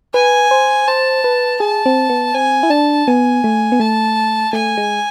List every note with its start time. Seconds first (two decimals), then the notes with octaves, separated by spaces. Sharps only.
0.14 B4 G#5
0.51 C5
0.88 C5 A5
1.24 B4
1.60 G#4 A5
1.86 C4
2.10 B3
2.34 C4 G#5
2.63 E4
2.70 D4 A5
3.07 B3 G#5
3.44 A3
3.72 B3
3.80 A3 A5
4.53 A3 G#5
4.77 G#3